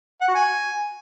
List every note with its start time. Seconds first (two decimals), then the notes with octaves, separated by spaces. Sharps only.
0.21 F#5
0.28 F#4
0.35 G#5